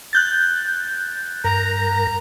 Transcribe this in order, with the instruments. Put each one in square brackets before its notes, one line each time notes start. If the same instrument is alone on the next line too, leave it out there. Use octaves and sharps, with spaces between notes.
[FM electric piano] F#6 G6 A6
[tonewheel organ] G2 A#4 A#6 [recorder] A#5